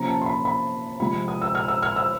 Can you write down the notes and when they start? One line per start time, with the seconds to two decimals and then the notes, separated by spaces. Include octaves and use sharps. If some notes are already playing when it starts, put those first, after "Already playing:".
Already playing: C3 F3 A#3 C#4 A#5
0.08 A5
0.22 C6
0.26 B5
0.45 B5
1.00 C3 F3 G#3 C4 B5
1.28 D#6
1.42 E6
1.55 F6
1.68 E6
1.82 F6
1.96 E6